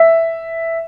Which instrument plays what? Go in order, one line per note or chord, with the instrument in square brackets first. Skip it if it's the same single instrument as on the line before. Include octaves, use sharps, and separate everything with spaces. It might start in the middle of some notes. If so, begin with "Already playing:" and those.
Already playing: [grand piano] E5